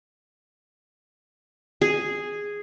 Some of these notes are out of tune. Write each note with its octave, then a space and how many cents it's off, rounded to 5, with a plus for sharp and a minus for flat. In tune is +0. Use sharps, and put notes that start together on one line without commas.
G#4 -5